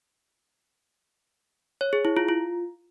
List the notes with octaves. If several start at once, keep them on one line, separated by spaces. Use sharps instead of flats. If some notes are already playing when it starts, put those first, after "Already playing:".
C#5
G#4
E4
F4
F4